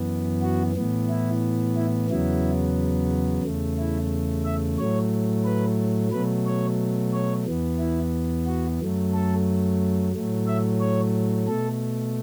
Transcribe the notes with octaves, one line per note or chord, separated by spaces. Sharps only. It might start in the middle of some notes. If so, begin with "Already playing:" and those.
Already playing: F#2 E3 B3
F#4
A2 E3 B3
E4
E4
E2 C#3 F#3 B3 E4
E2 C#3 A3
E4
E5
A2 F#3 A3 C#5
B4
B2 F#3 A3 B4
C#5
C#5
E2 E3 B3
E4
F#4
F#2 F#3 A3
A4
A2 F#3 A3
E5
C#5
B2 A3 A4